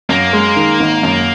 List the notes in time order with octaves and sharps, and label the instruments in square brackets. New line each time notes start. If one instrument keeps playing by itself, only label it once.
[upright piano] F#2 [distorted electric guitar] A#3
[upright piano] G#3
D#3
G#1
F#2